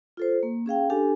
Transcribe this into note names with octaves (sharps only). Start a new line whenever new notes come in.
F4 A4 C5
A#3
C#4 G#4 F5 G5
D4 G4 A4 G#5